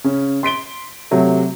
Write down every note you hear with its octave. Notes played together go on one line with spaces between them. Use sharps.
C#3 C#4
C6 B6 D7 G7
C3 F#3 A3